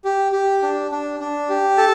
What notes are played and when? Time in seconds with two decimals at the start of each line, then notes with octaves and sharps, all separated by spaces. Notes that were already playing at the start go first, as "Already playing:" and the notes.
0.04 G4
0.32 G4
0.63 D4
0.92 D4
1.20 D4
1.49 G4
1.77 A4 A5